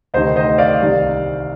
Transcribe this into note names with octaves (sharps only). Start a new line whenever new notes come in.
D2 C3 D#3 C5 D#5
C5 D#5
D5 F5
C2 C3 D#3